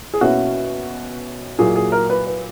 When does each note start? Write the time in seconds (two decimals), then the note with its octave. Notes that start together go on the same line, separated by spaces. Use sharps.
0.14 G#4
0.21 B2 A#3 C#4 E4 F#4
1.59 A#2 F#3 A#3 E4 G#4
1.76 G#4
1.92 A#4
2.10 B4
2.27 B4